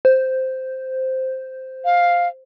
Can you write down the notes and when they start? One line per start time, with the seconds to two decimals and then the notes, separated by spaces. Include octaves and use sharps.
0.05 C5
1.85 F5